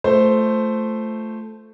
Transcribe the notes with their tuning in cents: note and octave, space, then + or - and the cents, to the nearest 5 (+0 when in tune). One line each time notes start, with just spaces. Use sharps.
A3 +0 F4 +0 C5 -5